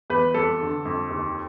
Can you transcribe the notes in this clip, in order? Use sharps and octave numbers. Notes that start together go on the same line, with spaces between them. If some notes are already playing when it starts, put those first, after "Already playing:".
E2 B4
F2 A4
D3
F2
D#2